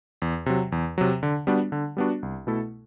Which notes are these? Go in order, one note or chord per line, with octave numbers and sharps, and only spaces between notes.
E2
C3 F#3
E2
C3 F#3
D3
G3 B3 D4 F#4
D3
G3 B3 D4 F#4
C2
B2 A3 E4 A4